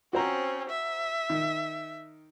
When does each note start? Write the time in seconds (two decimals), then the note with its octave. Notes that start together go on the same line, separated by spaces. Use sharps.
0.13 C4 C#4 F#4 C5 A#5
0.69 E5
1.30 D#3